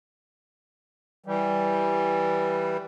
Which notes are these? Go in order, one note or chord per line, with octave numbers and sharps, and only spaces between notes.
E3 G3